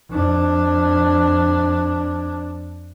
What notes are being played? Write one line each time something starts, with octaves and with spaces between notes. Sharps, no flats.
F2 D4